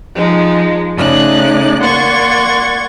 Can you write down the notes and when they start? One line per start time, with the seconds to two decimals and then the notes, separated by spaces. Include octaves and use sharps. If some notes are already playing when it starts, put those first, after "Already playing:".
0.14 F3 G#3 D#4
0.97 C#3 A3 D#4 D5 F#6
1.81 A#3 D5 F#5 C6 C#6 G#6